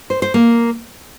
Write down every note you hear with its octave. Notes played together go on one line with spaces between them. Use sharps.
C5
C5
A#3